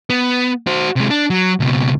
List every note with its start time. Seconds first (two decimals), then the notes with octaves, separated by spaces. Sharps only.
0.10 B3
0.67 F#4 C5
0.96 C3 G#3
1.10 D4
1.30 F#3
1.60 C#2 B2